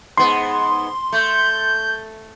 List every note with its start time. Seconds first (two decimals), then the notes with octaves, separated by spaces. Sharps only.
0.17 G#2 B3 C6
1.13 A3 G6